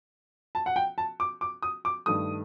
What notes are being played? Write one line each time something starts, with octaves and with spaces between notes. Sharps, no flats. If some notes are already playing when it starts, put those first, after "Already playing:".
A5
F#5
G5
A5
D6
D6
D#6
D6
G2 D#3 A3 D#6